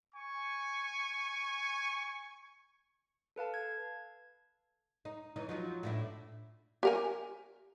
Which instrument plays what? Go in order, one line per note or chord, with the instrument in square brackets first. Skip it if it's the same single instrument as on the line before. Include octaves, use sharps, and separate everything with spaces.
[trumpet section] G#5 C#6
[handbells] A4 B4 F5 A5
G#6
[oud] D#4
E3 C#4 D#4
F3 F#3 D#4
A2 D4 E4
[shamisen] G4 A#4 G#5